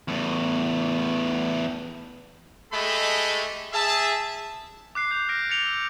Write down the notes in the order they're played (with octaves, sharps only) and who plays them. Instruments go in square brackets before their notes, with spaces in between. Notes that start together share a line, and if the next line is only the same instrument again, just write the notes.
[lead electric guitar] E2 A2
[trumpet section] G#3 A3 G4 A4 D#5 B5
G#4 E5 A5
[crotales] D6 F#6 C7
G6 F7
F6 A#6 D7
A6 C#7 F7 G7
E6